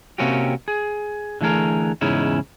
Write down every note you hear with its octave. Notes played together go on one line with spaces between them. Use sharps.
C3 A#3 C4 C#4 F#4 G4
G#4
D3 E3 A3 G#4 A#4
E2 G#2 C#3 C#4 D#4 E4